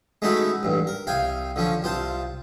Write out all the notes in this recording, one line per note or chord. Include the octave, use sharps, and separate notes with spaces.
G#3 A3 C#4 D#4 E4 F#4
A1 G2
A#4
C2 F5 G5 G#5
D3 F3 C#4
C2 F4 C5 A5